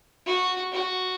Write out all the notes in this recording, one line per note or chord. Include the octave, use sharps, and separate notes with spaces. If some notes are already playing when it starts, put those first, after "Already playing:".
F#4
F#4